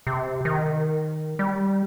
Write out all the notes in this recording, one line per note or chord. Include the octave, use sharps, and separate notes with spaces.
C3
D#3
G3